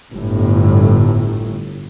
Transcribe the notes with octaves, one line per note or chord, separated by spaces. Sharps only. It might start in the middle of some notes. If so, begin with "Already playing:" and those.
G1 A2